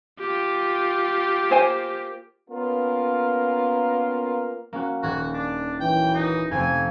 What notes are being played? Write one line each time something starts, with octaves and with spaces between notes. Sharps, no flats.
F4 G4
A#3 C5 G#5
A#3 B3 C#4 F4 A#4
A#3 C#4 F#4
D#1 F#4 F6 G#6
D4
F#2 E3 G5
D#4
F2 C3 A3 G#5